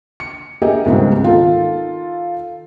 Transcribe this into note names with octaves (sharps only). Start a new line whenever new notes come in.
C#7
G4 G#4 A#4 D#5 E5
C#2 G#2 B2 G3 G#3 C4
D#3 F4 A4